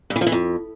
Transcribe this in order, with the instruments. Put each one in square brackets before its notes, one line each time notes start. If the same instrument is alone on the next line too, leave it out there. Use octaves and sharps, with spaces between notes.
[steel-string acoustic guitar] G2
E3
F3
E3
F2